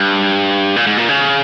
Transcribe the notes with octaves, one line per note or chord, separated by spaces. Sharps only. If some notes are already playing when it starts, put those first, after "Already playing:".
Already playing: G2
A#2
G#2
A#2
C#3